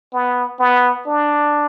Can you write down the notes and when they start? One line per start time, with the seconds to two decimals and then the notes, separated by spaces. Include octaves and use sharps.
0.13 B3
0.59 B3
1.06 D4